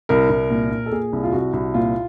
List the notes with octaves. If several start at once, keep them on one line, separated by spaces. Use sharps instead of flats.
C2 A#4
C2
A#2
A#2
A4
A#2 G#4
C2
F4
C2 F#4
C2
A#2 F4